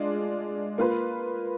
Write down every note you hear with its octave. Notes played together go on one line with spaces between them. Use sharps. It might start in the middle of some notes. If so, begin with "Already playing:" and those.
Already playing: G#3 D4 F4
A#3 F4 B4